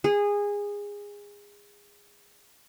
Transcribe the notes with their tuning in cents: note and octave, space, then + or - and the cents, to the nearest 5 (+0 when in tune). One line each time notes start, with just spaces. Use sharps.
G#4 -20